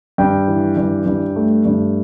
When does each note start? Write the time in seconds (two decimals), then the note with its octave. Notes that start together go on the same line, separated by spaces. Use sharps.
0.18 G2 G5
0.48 E3
0.77 G2
1.06 G2
1.36 A3
1.65 G2